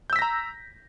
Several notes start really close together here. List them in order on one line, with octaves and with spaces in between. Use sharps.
G6 E6 B6 A#6 A#5